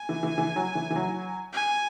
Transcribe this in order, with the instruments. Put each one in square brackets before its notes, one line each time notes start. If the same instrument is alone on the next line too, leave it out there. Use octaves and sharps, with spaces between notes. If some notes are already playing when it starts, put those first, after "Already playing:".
Already playing: [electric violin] G#5
[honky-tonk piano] E3
E3
E3
F#3
E3
E3
F#3
[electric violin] G#5